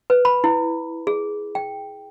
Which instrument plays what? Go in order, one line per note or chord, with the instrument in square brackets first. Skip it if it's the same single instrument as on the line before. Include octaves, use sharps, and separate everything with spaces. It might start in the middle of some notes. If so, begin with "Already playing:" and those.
[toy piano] B4
B5
E4
G#4
G5